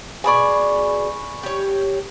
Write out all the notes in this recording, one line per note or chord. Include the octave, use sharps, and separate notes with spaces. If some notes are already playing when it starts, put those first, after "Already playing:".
B2 G#4 D5 G#5 B5 C#6
G4 C#5